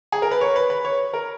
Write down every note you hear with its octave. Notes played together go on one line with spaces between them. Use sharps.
G#4
A#4
B4
C#5
B4
B4
C#5
A#4